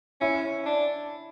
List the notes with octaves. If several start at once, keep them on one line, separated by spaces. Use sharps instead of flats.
C#4 E4
C#4
D4